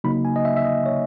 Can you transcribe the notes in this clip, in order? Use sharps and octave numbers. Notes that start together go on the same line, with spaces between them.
C#3 F#3 A#3 D#4 B5
G#5
D#5
E5
E5
D#5
C#5